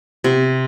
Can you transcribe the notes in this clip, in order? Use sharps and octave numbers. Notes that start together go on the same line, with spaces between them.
C3